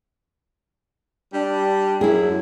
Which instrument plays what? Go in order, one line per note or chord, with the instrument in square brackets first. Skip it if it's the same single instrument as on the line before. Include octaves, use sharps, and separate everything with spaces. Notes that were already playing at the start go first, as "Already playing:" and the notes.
[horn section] G3 D4
[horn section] F#2 [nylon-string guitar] E4 G#4